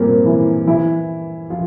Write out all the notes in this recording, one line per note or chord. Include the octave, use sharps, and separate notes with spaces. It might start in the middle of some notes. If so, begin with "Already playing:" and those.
Already playing: G2 A#2 A#3 C4
E3 E4
E3 E4
F3 F4